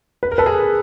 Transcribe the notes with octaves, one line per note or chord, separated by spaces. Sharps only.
B4
A#4
A4 B4
G#4 A#4